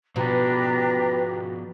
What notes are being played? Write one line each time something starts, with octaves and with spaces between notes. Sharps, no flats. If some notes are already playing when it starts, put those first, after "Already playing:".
B2 F3 B3 D4 G4 B4 A#5